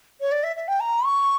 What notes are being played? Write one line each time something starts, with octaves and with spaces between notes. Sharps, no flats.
C#5
D5
E5
E5
G5
A#5
C#6